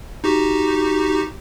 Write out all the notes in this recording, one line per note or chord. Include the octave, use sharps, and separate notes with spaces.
D#4 F#4 G4